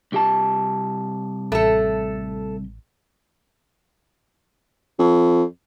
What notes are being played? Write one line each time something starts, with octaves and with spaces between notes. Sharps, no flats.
C2 G4 A5
A1 A3 A4
F2